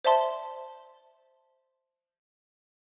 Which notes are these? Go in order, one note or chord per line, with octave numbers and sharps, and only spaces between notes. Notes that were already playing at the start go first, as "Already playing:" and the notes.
C5 D5 E5 A5 C6